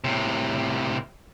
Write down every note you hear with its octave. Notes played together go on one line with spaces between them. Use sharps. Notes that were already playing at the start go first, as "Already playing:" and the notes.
A2 C3